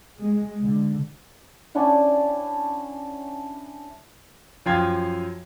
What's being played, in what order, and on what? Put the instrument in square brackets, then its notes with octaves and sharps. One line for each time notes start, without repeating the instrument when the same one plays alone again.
[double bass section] G#3
D3
[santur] C#4 D4 E4 F#5
[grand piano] F#2 F3 F5 G5 C6 G#6